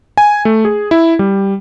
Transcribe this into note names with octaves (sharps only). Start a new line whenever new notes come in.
G#5
A3
G#4
E4
G3